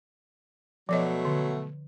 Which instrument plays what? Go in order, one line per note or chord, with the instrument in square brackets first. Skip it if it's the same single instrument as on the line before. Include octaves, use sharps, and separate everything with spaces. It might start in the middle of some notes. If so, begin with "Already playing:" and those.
[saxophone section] B2 F#3 A3 [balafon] F3 C#5 D#5
[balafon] D3